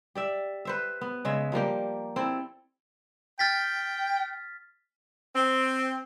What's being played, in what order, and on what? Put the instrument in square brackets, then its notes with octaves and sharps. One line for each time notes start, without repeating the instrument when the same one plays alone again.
[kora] G4 D5 E5
B4 C5 E5
B3
C#3 G#3 E5
F3 G3 A#3 G4
C4 E4 A4
[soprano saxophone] G5 [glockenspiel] F6 A6 B6
[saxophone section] C4